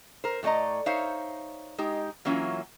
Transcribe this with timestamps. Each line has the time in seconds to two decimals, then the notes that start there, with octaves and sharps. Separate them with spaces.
0.24 A#4 C5
0.43 A2 A3 D5 D#5 A#5
0.86 D#4 C5 C#5 E5 F5
1.78 G#3 D#4 G4
2.25 E3 F#3 A#3 C#4 E4 F4